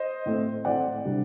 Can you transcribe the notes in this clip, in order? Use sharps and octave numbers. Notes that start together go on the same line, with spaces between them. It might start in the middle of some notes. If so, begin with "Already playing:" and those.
Already playing: C5 D#5
A2 A3 C4
A2 A3 C4 D5 F#5
C3 G3 D4